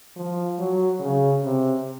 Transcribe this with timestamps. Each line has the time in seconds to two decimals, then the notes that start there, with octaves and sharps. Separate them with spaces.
0.16 F3
0.58 F#3
1.00 C#3
1.43 C3